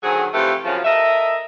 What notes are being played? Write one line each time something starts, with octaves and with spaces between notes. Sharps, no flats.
D3 D#3 F#3 C4 G#4
C3 E3 F3 A3 G4 B4
F#2 C#3 F3
A4 A#4 D#5 E5